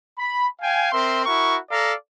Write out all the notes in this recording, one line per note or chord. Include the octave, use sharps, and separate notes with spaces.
B5
F5 G5 G#5
C4 A#4 E5 C6
E4 F#4 A#4 C#6
A4 D5 F5 A#5